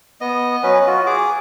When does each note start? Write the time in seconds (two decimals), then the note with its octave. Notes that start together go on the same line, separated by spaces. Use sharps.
0.21 B3 D#5
0.63 F#3 C#4 B4
0.87 F4 F#4
1.06 G#4 D6